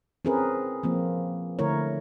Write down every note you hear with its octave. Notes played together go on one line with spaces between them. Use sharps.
C4 C#4 G#4 A#4 B4
F3 A#3 C4
D3 A3 E4 A#4 C#5